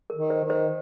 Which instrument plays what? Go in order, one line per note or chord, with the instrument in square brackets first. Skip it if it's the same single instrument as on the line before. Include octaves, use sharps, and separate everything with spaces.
[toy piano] A#4
[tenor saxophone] D#3
[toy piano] C5
[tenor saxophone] D#3
[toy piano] C5